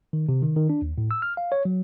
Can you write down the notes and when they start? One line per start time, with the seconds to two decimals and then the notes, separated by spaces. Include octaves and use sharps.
0.13 D#3
0.29 C3
0.42 D#3
0.56 D#3
0.69 D4
0.82 D#2
0.98 A2
1.11 E6
1.22 F6
1.37 F5
1.52 C#5
1.65 F#3